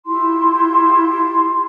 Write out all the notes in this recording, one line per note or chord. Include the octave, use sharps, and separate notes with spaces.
E4 F4 G4 C6